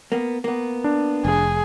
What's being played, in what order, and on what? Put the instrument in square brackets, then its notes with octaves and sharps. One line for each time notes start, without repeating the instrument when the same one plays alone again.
[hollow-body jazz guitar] A#3 B3
A#3 B3
[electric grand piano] D4
[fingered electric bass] F1 [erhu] G#4